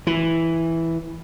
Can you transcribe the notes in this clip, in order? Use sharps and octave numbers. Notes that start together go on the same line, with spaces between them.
E3